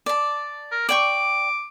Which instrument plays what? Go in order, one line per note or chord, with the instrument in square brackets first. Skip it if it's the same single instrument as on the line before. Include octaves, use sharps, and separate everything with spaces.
[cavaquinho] D5 A5
[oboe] A#4
[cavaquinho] D5 G5 C#6 [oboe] D6